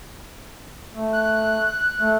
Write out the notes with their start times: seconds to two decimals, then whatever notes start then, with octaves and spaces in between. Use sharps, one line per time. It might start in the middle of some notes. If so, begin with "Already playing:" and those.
0.94 A3
1.13 F#6
2.00 A3